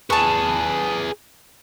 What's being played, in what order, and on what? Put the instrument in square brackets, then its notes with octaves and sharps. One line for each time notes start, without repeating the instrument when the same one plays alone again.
[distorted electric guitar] G#4 B4 [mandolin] A5 C#6